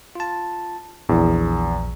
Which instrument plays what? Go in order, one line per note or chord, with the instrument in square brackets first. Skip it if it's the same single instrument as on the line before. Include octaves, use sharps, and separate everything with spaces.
[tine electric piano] F4 A5
[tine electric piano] A#1 [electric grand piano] E2